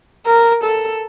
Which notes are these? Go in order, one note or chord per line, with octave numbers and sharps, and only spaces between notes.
A#4
A4